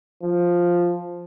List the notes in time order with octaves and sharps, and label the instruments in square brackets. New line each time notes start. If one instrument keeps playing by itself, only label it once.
[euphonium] F3